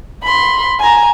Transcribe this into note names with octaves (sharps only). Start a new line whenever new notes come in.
B5 C6
G#5 A#5